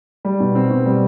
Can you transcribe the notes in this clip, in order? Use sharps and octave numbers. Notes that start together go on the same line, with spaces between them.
G3
B2
C4
B2
G3